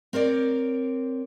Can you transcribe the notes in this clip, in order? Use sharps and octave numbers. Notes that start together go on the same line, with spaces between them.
C4 A#4 C#5 D5